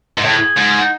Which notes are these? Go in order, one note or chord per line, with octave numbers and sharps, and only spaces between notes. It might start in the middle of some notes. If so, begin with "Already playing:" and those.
G#2
A2 G#4
G#2
D#4